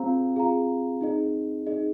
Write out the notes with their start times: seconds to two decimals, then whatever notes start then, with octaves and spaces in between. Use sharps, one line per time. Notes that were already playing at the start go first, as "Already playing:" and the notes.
Already playing: C4 F4 G#4 F5 A#5
0.36 F4 G#4 F5 A#5
1.01 D#4 G#4 D#5
1.67 D#4 G#4 D#5